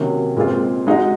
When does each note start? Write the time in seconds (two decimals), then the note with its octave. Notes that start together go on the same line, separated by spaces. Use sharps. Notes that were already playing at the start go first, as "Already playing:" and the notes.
Already playing: C3 D#3 F#3 A#3 C#4
0.36 A#2 G#3 C4 F4
0.87 G#3 D#4 F#4